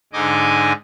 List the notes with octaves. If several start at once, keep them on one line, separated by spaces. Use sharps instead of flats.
G#2 D3 D#4 D#5 G#5 D6